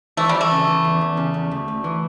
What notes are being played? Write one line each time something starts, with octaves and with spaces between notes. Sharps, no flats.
E3 A3
E3 G3
A3
C#3
E3
E2
E2
C#3
E2
D2
D2
E3